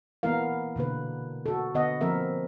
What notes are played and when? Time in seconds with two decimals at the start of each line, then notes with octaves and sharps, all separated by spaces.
0.23 E3 A#3 B3 E4 A#4 F5
0.76 B2 D3 A#3 B4
1.46 F#4 A4
1.75 D3 B3 D#5 F#5
2.01 F3 A#3 C4 A#4 E5